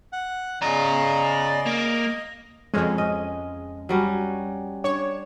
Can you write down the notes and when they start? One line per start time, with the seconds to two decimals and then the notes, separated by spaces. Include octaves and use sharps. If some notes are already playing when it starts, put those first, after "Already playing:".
0.13 F#5
0.62 C#3 D5 D#5 A#5
1.66 A#3
2.74 F2 G#3 C#4
2.98 C#4 D#5
3.89 F#3 G3 C#4
4.84 D4 C#5